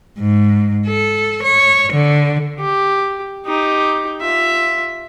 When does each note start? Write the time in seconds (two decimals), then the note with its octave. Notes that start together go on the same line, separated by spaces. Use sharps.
0.19 G#2
0.86 A4
1.43 C#5
1.93 D3
2.60 G4
3.46 D#4 G4
4.21 F4 E5